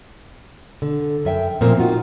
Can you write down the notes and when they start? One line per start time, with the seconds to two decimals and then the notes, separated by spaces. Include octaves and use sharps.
0.82 D3
1.25 F#2 E5 G5
1.61 A#2 F3 A#3 C4
1.79 D#4 F4 F#4